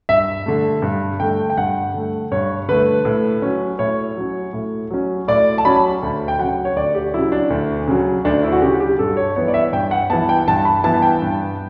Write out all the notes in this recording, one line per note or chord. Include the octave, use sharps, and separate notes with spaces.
G2 E5
D3 A3
G2
D3 A3 G5
G5
G2 F#5
D3 A3
G2 C#5
D3 A3 B4
A2
F#3 C#4
A2 C#5
F#3 C#4
A2
F#3 C#4
A2 D5
A5
F#3 C#4 B5
D2
G5
C#3 F#3 F#5
C#5
D2 D5
G4
C#3 F#3 E4
D4
D2
C#3 F#3
D2 D4
E4
F#4
C#3 F#3 G4
G4
G2 A4
C#5
E3 B3 C#5
D5
E5
G2 G5
F#5
E3 B3 A5
G5
G2 A5
B5
E3 B3 A5
G5
G2